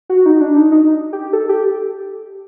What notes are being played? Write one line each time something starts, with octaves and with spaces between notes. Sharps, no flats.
F#4
D#4
D4
D#4
D#4
G4
A4
G4